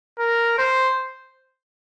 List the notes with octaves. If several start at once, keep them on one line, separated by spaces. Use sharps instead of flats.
A#4
C5